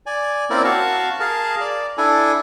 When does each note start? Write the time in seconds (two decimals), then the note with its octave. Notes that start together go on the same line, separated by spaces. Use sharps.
0.06 D5 G#5
0.50 A#3 C4 C#4 E4 A#4 D5
0.64 F#4 F5 A5 C#6
1.20 G#4 A#4 F5 A5
1.61 D5
1.98 D4 E4 A4 G#5